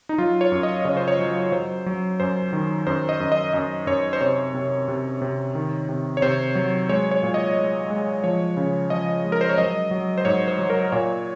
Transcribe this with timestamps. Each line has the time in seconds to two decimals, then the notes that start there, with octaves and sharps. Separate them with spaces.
0.09 D#4
0.18 F#3 F4
0.41 C#5
0.52 F#2
0.63 D#5
0.85 C#3 C#5
0.97 C5
1.08 C#5
1.19 F#3
1.52 F#3 C5
1.86 F#3
2.20 F#2 C5
2.53 D#3
2.87 F#2 C5
3.09 D#5
3.20 F#2
3.32 D#5
3.54 F#2 D#5
3.87 F#2 C#5
4.13 C5
4.21 C3 C#5
4.54 C3
4.88 C3
5.22 C3
5.55 D#3
5.89 C3
6.17 C#5
6.22 C3 C5
6.55 F#3
6.89 G#3 C#5
7.11 C#5
7.23 A#2
7.34 D#5
7.56 G#3
7.90 G#3
8.24 F3 C#5
8.57 C#3
8.90 F3 D#5
9.25 G#3
9.32 A#4
9.41 C5
9.49 C#5
9.58 F#3 D#5
9.91 F#3
10.18 C5
10.25 G#2 C#5
10.48 C5
10.59 F#3
10.70 A#4
10.92 A#2 C#5